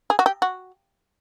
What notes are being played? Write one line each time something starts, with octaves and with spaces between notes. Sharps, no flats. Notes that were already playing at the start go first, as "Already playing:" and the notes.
G#4
F#4
G4
F#4